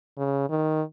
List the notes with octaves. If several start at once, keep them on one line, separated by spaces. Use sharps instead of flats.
C#3
D#3